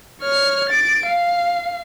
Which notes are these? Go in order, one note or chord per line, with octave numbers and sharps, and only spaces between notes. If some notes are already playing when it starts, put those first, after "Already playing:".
C#5 F6
A6 D7
F5